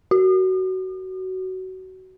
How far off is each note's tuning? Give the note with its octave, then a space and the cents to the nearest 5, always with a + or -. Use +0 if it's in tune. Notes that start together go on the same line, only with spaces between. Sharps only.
F#4 +20